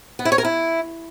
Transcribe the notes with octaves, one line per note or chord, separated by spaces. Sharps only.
B3
E4
C#5
A#4
E4